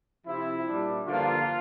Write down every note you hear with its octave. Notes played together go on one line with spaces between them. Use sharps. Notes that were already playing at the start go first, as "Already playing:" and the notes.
C3 F3 C4 E4
A#2 G3 D4
G2 D3 F3 A#3 D4 F4